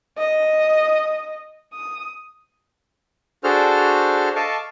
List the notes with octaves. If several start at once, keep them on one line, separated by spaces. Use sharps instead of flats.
D#5
D#6
D4 F#4 G#4 A4 C5 F6
A4 D#5 F5 A5 C#6 D6